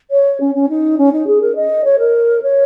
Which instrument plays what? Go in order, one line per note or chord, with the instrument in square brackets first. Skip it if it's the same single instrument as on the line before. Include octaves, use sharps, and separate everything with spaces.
[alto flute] C#5
C#4
C#4
D#4
C#4
D#4
G#4
A#4
D#5
C#5
A#4
C#5